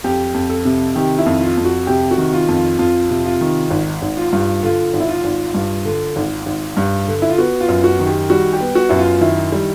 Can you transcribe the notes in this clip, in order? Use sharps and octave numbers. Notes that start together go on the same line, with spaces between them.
F2 G4
F2
A4
C3
D#3 G4
E4
F2
F4
F2
F#4
C3 G4
F#4
D#3
F4
F2
F4
F2 F4
C3
F4
D#3
G#1
G#1
F4
G2
D3 F4
G#1
E4
F4
G#1
G2
D3
G#1
G#1
G2
D3
E4
F4
B3 F#4
F4
F#2
F#4
D#3
G4
G3 F#4
G4
B3
F#4
F#2 E4
F4
D#3 E4
G3